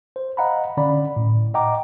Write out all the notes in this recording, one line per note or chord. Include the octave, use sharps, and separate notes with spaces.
C5
D#5 F5 F#5 A#5 B5
D3 C#4 D5 B5
A2
D#5 F#5 G5 A#5 D6